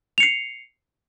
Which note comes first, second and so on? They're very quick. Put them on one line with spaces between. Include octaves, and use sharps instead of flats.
F7 C#7 C7